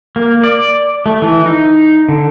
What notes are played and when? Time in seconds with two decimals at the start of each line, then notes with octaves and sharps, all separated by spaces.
0.16 A#3
0.43 D5
1.06 A3
1.22 E3
1.46 D#4
2.09 D3